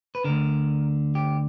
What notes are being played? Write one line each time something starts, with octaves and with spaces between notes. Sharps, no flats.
B4
D2 D3 A#4
G4